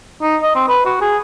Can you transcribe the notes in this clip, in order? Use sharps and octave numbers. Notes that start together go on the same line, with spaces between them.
D#4
D#5
C4
B4
F#4
G#4